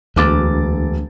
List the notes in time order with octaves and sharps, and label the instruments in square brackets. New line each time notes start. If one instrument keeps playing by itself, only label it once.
[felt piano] E1 D6 A6 [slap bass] D2